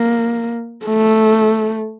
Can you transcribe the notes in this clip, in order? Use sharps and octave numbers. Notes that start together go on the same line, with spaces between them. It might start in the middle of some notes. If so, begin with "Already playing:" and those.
Already playing: A#3
A3